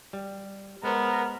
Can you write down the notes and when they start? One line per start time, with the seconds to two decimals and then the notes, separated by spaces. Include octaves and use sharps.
0.13 G3
0.83 G#3 B3 A#4 C5